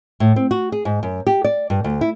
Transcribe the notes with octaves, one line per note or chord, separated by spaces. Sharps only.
A2
C4
F#4
G#4
G#2
F#2
G4
D5
G2
D2
E4